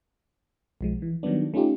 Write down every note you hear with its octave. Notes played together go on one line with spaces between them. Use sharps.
B1 F3 G#3
E3
D#3 F#3 G3 B3 D4
A3 C#4 D#4 F4 G4